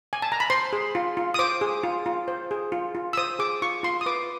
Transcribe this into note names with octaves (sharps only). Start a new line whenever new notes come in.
G#5
A5
A#5
B5
C5 C6
G#4
F4
F4
D#6
C5 D6
G#4
F4
F4
C5
G#4
F4
F4
E6
C5 D#6
G#4 D6
F4 C#6
F4 C6
D#6
B4 D6